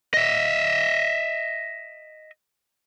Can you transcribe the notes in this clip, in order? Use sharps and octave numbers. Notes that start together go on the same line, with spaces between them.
D#5 E5